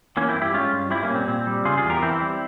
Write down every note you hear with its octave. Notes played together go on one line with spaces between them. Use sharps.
E3 A#3 C#4
C4 E4
G2
E4 G4
G#3 C#4 F4
G2
G3 C4 E4
A#3 C#4
A#2
C4
A#2 C4
G3
C#3 F4 G#4
F4 G#4
E2
G4 A#4
E3 C4 E4
G3